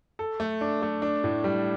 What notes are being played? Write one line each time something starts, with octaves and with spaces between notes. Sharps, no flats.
A4
A3
D4
A3
D4
A2
G3